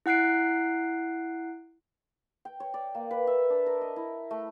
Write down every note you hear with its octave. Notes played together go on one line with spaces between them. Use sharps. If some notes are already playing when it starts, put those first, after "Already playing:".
E4 F#5 F#6 C7 D7
G5
C#5
D5
A#3
B4
E5
D4
A#4
D#5
E4
A3